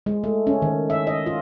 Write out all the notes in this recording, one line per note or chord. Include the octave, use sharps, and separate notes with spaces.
G#3
A3
C#4
D#3
E5
D#5
F4